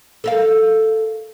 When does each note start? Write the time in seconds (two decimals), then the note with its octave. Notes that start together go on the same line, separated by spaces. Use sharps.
0.24 A4 A#4 F5